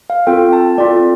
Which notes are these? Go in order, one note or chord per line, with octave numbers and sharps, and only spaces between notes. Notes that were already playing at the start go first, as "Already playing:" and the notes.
F5
C4 F4 A4 G5
A5
C4 F4 A4 D5